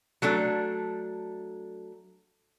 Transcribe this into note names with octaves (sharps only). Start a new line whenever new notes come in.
F#3 A3 D4 A4